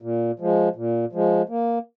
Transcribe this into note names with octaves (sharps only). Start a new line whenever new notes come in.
A#2
F3 G#3
A#2
F3 G#3
A#3